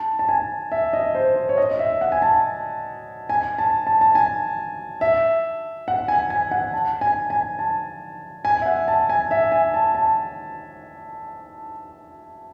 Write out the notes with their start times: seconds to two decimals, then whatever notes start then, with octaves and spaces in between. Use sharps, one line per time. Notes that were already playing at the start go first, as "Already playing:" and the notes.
Already playing: A5
0.19 A5
0.29 G#5
0.72 E5
0.93 D#5
1.15 C5
1.36 C5
1.49 C#5
1.57 D#5
1.71 D#5
1.79 E5
2.01 F#5
2.12 G#5
2.22 A5
3.29 G#5
3.58 A5
3.87 A5
4.01 A5
4.15 G#5
5.01 E5
5.88 F#5
6.08 G#5
6.30 G#5
6.51 F#5
6.73 A5
7.01 G#5
7.30 G#5
7.59 A5
8.45 G#5
8.61 E5
8.66 F#5
8.88 A5
9.09 G#5
9.31 E5
9.52 G#5
9.74 A5
9.95 A5